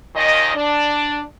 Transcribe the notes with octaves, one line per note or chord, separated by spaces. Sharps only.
D#2 A#2 D#3 D#5
D4